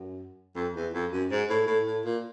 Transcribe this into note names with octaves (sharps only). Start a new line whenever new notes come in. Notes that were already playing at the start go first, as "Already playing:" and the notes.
Already playing: F#2
F2
E2
F2
F#2
G#2
A2
A2
A2
A#2